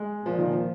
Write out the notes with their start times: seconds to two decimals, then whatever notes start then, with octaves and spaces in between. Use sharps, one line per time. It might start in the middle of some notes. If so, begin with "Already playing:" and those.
Already playing: G#3
0.25 A#2 F3
0.38 D#3
0.51 F3